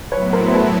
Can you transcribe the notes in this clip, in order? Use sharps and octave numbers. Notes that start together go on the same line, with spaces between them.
A2 F#3 B3 E4 B4 C#5
A#4 C5
C5
A4 B4